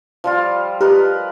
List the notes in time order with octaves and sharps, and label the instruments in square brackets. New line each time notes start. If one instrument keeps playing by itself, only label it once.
[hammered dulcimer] F3 G3 F4
[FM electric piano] G4 [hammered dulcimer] A#4 B4 D#5